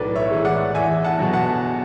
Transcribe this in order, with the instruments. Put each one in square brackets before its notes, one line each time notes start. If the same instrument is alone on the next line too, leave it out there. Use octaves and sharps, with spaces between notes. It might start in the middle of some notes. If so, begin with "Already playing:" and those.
Already playing: [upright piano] B1 A2 E3 A4 B4 D5
C#5 E5
A2 E3 G#3
D5 F#5
E2 E5 G#5
F#5 A5
B2 F#3
F#5 A5